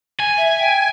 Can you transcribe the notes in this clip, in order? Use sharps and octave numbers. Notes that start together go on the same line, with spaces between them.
G#5
E5
G5